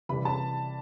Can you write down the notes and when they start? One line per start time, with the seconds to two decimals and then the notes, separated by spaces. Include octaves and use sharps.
0.09 C2 C3 E3 B5
0.25 A5